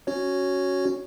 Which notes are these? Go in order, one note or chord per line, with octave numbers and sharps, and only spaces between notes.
C#4 F#4 C#5